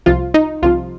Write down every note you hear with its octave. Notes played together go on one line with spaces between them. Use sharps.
C2 C3 F3 F4
D#4
C2 C3 F3 F4